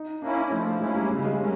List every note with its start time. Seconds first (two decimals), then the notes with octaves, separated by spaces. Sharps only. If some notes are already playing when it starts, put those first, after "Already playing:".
Already playing: D#4
0.22 A#3 C#4 D4 E4
0.51 F3 A3
0.65 A3
0.80 G#3 A#3 C#4 E4
0.94 G3
1.10 C#3 G#3
1.17 G3
1.24 G#3
1.39 F#3 A#3 C#4